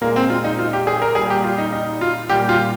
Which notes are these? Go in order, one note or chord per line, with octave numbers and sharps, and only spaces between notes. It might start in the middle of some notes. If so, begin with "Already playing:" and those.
A#2 G#3 A#3
C4
F4
D#4
F4
G4
G#4
A#4
A#2 G3 G#4
G4
F4
D#4
D#4
F4
A#2 G3 G4
F4